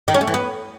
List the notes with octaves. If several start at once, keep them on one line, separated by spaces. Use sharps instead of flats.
D#3
C#4
A3
E3
B3